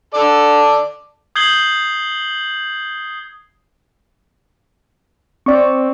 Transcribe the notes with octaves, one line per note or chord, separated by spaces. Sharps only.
A4 D5
D#6 G6 G#6 C7 F#7 G7
C4 D5 C#6